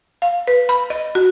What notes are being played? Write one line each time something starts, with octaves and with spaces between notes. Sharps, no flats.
F5
B4
B5
D#5
F#4